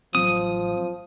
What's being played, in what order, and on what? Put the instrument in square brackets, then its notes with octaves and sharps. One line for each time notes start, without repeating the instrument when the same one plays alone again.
[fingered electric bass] A1 F#3 C4 [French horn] F3 [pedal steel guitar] D#6